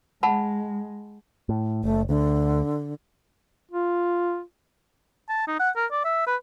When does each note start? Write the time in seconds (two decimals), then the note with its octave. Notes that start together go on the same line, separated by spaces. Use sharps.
0.23 G#3 F#5 A5 B5
1.49 A2
1.84 F#1 A3
2.09 D2 D3
3.71 F4
5.29 A5
5.48 D#4
5.60 F#5
5.76 A#4
5.92 D5
6.04 E5
6.27 B4